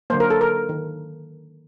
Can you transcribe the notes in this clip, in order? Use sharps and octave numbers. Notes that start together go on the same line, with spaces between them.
D3 F#3 A#3 C5
A#4
A4
A#4
D#3